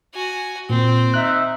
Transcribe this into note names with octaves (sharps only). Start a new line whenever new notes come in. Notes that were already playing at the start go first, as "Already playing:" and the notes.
F#4 G#5
A#2 C4
D#4 E5 F#6